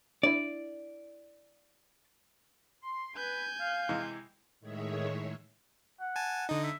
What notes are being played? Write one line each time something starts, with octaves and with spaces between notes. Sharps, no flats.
D4 E4 D5
C6
B4 G#5 G6
F5
C3 E3 G#3
A2 D#3 G#3 G#4 C#5 E5
F#5
G#5 A5
D3 D#4 D#5
E5